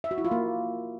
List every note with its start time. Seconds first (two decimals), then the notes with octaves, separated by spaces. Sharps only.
0.04 E5
0.11 F#4
0.18 E4
0.25 F4
0.31 A#3